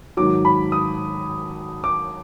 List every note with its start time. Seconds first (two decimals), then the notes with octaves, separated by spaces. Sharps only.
0.17 G#2 D#3 F#3 D6
0.45 B5
0.72 D#6
1.84 D6